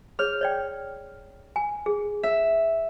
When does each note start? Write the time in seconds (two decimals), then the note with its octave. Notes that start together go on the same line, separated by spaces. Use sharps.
0.19 G#4 C#5 F6
0.41 C#5 D5 G5
1.56 G#5
1.86 G#4
2.23 E5